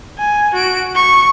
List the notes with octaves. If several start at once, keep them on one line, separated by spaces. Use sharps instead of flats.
G#5
F#4 D7
C#6